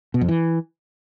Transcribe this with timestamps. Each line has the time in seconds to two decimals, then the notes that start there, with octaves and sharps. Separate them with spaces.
0.14 B2
0.21 F2
0.28 E3